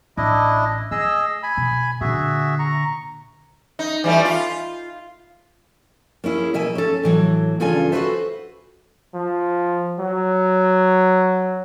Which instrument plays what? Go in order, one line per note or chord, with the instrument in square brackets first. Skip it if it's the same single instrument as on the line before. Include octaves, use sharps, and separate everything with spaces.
[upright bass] A1 [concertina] D4 E4 D#5
[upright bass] A3 [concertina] G#4 D#5 E6
[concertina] G#5 B5
[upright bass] B2
[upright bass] A#2 D3 [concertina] F#4 G#4 E5
[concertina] A#5 C#6
[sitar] D#4
E3 G3 A3
F4
[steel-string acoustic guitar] A#3 C#4 E4 G#4
B2 A#3 E5 G#5
C#4 A4
A2 E3 F#3
E2 G2 C#3 F4 A4 G#5
F#4 G4 A4 B4 C5 E5
[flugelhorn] F3
F#3